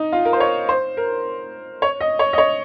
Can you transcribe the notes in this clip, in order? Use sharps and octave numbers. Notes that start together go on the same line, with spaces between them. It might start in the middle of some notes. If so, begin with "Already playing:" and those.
Already playing: D#4
F4
A#4
C5
C#5
C5
A#4
C#5
D#5
C#5
D#5
C#5